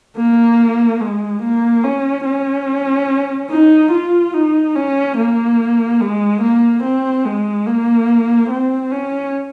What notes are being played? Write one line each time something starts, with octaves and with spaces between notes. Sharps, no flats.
A#3
G#3
A#3
C#4
C#4
D#4
F4
D#4
C#4
A#3
G#3
A#3
C4
G#3
A#3
C4
C#4